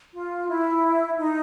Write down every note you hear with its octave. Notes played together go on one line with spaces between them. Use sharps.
F4
E4
D#4